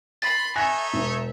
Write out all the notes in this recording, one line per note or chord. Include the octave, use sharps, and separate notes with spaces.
B5 C6 A6
D#4 A4 C#5 E5 G#5 F#6 A#6
E1